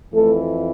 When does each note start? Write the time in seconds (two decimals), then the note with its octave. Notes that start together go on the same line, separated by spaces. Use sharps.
0.13 F2 E3 A3 A4